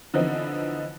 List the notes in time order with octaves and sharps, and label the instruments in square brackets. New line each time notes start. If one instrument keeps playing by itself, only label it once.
[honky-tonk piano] D3 E3 F3 B3 C4 D#4